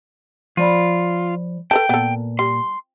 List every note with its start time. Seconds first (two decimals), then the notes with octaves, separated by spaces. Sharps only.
0.57 F3 F4 D5 B5
1.71 A4 B4 G5 A5
1.89 A#2 B3 A4
2.39 G3 C6